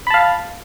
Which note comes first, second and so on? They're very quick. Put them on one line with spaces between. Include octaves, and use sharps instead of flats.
B5 A5 F5